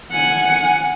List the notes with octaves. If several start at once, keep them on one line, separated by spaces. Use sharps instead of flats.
F#5 G#5